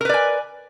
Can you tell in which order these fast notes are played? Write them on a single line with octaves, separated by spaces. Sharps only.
A#4 B4 D5 G#5